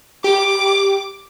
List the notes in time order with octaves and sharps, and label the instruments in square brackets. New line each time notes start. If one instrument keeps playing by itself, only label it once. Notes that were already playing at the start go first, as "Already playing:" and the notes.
[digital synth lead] G4 [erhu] D6